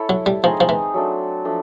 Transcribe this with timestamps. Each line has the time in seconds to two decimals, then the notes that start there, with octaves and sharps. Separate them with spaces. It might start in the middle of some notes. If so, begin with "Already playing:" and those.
Already playing: E4 A4 C#5
0.09 F#3
0.26 G3
0.43 F3 C4 D#4 G#4 C#5
0.60 F3
0.69 E3
0.94 F#3 A3 D4
1.45 F3 A3 D4